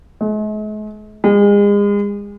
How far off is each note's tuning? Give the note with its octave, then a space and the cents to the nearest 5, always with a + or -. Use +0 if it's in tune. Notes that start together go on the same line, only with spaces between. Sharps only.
G#3 +45
G#3 -35